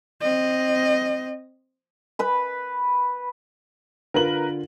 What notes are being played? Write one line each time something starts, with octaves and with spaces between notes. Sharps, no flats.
C4 D#5
B4 B5
D3 F4 A#4 B4 F#7